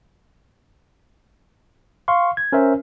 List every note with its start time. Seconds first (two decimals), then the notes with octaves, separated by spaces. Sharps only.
2.08 F5 C6 C#6
2.37 G#6
2.52 C#4 A#4 C5 E5